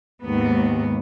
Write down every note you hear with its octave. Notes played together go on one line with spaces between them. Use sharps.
D#2 G#2 B3